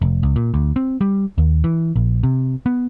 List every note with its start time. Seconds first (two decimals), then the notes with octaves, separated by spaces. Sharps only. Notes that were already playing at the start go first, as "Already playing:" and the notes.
0.02 F1
0.23 C#2
0.36 A#2
0.54 D2
0.76 C4
1.01 G3
1.38 D#2
1.64 E3
1.96 A#1
2.23 C3
2.66 B3